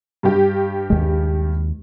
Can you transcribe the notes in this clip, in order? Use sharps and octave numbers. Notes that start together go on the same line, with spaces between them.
G2 G4
D#2 G#3